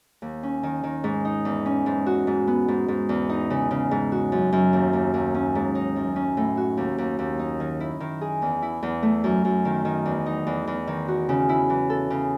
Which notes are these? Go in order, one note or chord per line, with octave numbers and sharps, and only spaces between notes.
D#2
C#4
D#3
D#3
G#2
D#4
E2
C#4
G#2
F#4
G#2
B3
G#2
G#2
E2
D#4
C#3
C#3
G#2
F#4
F#2
F#2
D#2
D#2
D#2
C#4
G#2
D#4
F#2
C#4
A2
F#4
D#2
D#2
D#2
D#4
D#3
E4
D#3
G#4
E2
E4
E2
A3
F#2
F#2
D#3
D#3
E2
D#4
E2
E2
D#3
F#4
C#3
E4
E3
A4
C#3